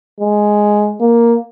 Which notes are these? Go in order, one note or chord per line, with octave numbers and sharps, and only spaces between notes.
G#3
A#3